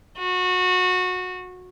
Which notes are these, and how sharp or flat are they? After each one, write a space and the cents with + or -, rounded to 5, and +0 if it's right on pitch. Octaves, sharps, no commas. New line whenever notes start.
F#4 -20